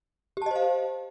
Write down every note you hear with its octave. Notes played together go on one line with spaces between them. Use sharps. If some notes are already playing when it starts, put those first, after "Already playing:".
G4 C5 D#5 F5 A5